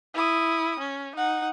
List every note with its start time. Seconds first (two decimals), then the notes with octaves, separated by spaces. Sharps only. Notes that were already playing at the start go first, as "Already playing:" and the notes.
0.14 E4 D#6
0.79 C#4
1.16 D#4 F#5